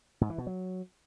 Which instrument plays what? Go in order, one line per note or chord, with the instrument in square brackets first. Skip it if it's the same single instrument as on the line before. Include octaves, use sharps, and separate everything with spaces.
[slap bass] G#2
E3
B2
F#3